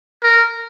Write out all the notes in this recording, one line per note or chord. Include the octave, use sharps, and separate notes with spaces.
A#4